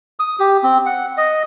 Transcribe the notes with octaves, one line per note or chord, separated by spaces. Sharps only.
D#6
G4
C4
F#5
D#5